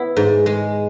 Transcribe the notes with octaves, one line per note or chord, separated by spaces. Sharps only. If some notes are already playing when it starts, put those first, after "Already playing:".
Already playing: B3 E4
G#2
G#3